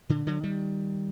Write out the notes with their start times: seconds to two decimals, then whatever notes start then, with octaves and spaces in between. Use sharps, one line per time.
0.09 A#2 D3
0.27 D3 F#3
0.43 D#3 G3